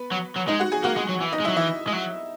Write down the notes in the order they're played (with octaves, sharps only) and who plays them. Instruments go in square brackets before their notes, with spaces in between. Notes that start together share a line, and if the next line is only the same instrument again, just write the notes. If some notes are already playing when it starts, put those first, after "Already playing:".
Already playing: [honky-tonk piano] B3 B4
[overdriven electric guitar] F#3
F#3
[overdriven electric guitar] G#3 [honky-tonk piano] D#4 D#5
[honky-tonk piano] F#4 F#5
G#4 G#5
[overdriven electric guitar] A#3 [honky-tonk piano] F#4 F#5
[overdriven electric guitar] G#3
F#3
E3
[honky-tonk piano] D#4 D#5
[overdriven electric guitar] G#3
[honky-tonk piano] E4 E5
[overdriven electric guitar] F#3
[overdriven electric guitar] E3 [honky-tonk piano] E4 E5
[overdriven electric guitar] G#3
F#3